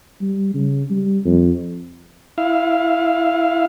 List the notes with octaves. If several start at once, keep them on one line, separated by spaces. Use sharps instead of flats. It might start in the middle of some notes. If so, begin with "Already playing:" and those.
G3
C#3
G3
F2
E4 F5